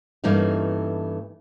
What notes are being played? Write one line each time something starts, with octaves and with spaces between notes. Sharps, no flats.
G2 E3 A3 A#3 C#4 D#4